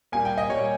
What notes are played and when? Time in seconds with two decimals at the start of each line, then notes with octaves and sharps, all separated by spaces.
0.12 A#2 G3 A#3 G#5
0.25 G5
0.38 D#5
0.49 A#2 G3 A#3 C#5